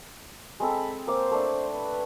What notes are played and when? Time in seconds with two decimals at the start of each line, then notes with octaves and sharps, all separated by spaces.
0.60 G#3 C4 A4 B5
1.07 A#3 C5 D6
1.31 A3 D4
1.73 B4